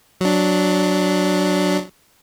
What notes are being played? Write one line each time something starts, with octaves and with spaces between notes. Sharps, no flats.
F#3 D4